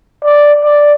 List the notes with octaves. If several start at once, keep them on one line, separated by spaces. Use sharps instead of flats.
D5
D5